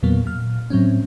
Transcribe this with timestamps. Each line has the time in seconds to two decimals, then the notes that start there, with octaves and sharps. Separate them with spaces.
0.03 E2 A#2 F#3 A#3 B3
0.25 A#2 F6
0.70 A2 F#3 C4 C#4